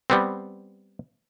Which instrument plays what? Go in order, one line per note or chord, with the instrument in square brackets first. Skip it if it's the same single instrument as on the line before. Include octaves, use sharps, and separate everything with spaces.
[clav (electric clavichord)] G3 B3 C4